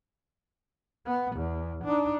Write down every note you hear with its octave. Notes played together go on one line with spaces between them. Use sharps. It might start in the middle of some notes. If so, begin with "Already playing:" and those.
B3
E2
D4 D#4